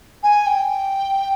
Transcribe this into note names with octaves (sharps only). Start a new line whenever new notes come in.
G#5
G5